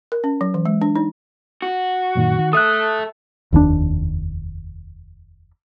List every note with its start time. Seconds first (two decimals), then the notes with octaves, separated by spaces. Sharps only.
0.12 A#4
0.24 C#4
0.41 F#3
0.54 E3
0.66 G#3
0.82 D4
0.96 D#4
1.62 F#4
2.15 F#2 A#2 D#3
2.38 D#3
2.53 A4 E5 D#6 F#6
3.52 F1 D#2 C3 D4